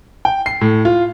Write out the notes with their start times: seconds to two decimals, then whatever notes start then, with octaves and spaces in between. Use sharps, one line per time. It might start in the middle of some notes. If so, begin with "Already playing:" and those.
0.25 G5
0.46 C7
0.61 A2
0.85 F4